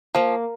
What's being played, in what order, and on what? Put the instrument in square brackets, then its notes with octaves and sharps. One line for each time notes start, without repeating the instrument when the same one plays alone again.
[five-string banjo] F3 [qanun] A#3